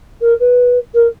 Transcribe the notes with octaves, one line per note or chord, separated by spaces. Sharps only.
A#4
B4
A#4